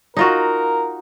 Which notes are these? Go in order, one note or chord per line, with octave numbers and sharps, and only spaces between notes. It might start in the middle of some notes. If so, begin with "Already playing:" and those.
D#4 F4 F#4 A#4